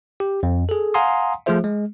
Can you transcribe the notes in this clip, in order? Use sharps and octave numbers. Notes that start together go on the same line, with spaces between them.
G4
F2
G#4 A4
F5 F#5 G#5 A#5 C6 D#6
F3 A3 F4 G#4 C5 E5
G#3